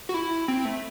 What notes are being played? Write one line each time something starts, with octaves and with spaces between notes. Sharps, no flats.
F#4
E4
C4
A3